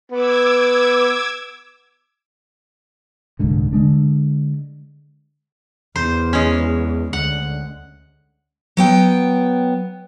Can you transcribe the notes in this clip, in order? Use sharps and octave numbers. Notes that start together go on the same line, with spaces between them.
B3 D6 E6 G#6
D#1 C2 G#2 D3
D3 F3 G#3 D4
E2 C5
G#3 C#4
D2 F#5
F#3 B3 G5